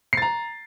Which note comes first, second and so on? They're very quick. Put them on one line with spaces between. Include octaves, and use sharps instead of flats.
C7 A6 A#5